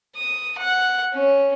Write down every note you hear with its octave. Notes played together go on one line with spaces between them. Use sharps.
D#6
F#5
C#4